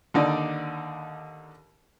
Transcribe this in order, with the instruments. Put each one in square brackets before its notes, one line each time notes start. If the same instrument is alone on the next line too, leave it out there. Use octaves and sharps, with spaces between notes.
[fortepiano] D#2 D3 D#4 D5